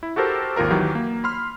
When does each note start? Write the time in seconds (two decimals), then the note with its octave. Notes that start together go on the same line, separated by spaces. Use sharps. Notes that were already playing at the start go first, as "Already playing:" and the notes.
0.03 E4
0.16 F#4 G4 A4 A#4 C5
0.56 G#1 D#2 F4 A#4 A#5
0.70 D#3 E3 F#3 G4
0.95 A#3
1.24 B5 C6 F6